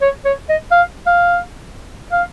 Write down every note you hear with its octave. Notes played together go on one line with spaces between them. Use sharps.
C#5
C#5
D#5
F5
F5
F5